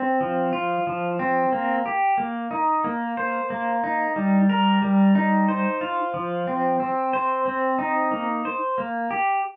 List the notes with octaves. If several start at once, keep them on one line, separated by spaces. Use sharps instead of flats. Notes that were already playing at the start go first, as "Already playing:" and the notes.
Already playing: C4
F3
F4
F3
C4
A#3
G4
A#3
D#4
A#3
C5
A#3
D#4
G3
A#4
G3
D#4
C5
F4
F3
C4
C4
C5
C4
D#4
A#3
C5
A#3
G4